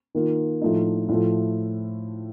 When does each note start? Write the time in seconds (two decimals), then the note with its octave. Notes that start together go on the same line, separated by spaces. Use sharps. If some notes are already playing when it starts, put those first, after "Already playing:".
0.15 D#3 A#3 F4
0.61 A2 F3 A3 D#4
1.08 A2 F3 A3